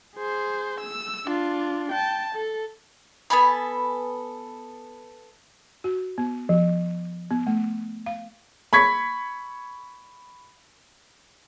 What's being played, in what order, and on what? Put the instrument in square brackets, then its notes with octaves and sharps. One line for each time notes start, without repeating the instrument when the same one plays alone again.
[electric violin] G#4 C5
E6
D4 F4
G5 A5
A4
[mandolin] B3 A4 G#5 B5
[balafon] F#4
B3
F3
B3
A3
F5
[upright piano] B5 C#6 G#6 B6